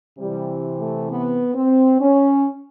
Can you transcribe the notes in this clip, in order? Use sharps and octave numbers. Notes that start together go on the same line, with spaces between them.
C3 E3 G3
A3
B3
C4
C#4